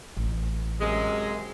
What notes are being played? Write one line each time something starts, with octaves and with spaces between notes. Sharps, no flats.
A1
F#2 C3 G#3